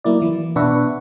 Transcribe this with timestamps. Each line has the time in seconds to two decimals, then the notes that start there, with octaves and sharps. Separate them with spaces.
0.04 F#3 A#3 E4 D5
0.22 E3
0.56 B2 D4 B4 E5 F#5 C#6